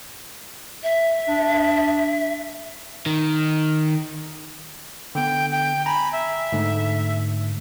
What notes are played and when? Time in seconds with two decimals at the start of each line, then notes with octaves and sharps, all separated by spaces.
0.83 E5
1.29 D4
3.06 D#3
5.15 D3 B3 G5
5.51 G5
5.86 G#5 A#5 B5
6.13 E5
6.52 G#2 D3 A3